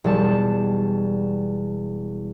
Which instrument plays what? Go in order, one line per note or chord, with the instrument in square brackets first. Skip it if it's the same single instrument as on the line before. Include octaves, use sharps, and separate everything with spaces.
[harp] E1 G3 A5